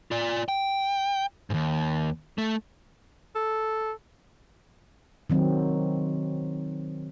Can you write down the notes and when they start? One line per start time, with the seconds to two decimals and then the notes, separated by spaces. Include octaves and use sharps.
0.11 F4 D5
0.49 G5
1.50 D#2 G#2
2.38 A3
3.35 A4
5.30 D#3 F#3 C4